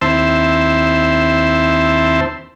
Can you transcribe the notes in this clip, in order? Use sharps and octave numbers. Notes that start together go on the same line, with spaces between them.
D#2 C4 E4 C5 A5